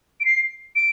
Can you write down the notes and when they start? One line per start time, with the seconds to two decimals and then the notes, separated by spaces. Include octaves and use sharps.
0.20 D7
0.25 C7
0.76 D7